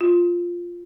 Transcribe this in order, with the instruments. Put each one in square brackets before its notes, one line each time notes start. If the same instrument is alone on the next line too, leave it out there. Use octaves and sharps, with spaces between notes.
[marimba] F4